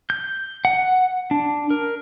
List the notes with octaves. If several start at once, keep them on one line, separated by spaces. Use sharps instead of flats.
G6
F#5
D4
A#4